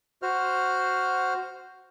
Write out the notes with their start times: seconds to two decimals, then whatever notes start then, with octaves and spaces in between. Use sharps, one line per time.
0.22 F#4 C5 F6